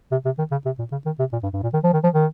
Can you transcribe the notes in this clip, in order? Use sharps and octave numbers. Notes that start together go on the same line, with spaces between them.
C3
C3
D#3
C#3
C3
A#2
C#3
D#3
C3
A#2
G2
G2
A#2
D#3
F3
D#3
F3
D#3